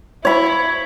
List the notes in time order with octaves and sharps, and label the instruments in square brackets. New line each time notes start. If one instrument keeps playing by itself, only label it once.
[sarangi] E4 [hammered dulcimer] C#5 B5